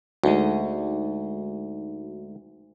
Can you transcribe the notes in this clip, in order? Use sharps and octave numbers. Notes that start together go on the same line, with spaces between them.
D2 G#3 D#4 F#4